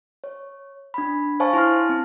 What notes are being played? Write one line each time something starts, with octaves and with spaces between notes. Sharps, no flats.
C#5
D4 B5
C5 C#5 F5 G#5 A5 C#6
E4 A5 C6 F6
C4